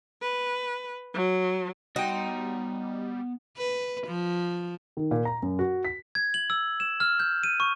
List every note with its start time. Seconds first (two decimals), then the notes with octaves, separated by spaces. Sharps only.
0.22 B4
1.14 F#3
1.96 G3 B3 D#4 F#4 G5 C6
3.57 B4
4.07 F3
4.97 D#3
5.11 A#2
5.25 A#5
5.42 F#2
5.59 F#4
5.85 B6
6.15 G#6
6.34 F#7
6.50 E6
6.80 E7
7.00 F6
7.20 G6
7.43 D#7
7.60 C#6